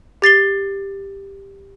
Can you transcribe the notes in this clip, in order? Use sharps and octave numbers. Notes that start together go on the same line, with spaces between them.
G4 A6 C7 G7